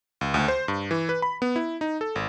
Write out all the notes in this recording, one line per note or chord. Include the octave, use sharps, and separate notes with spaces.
C#2
D2
C5
G2
E3
B4
B5
B3
E4
D#4
A4
G#1